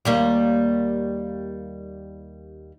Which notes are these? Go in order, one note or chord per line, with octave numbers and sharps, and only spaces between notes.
D#2 G3 A#3